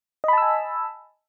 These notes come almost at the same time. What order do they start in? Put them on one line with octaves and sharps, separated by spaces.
D#5 B5 A5 E6 G#5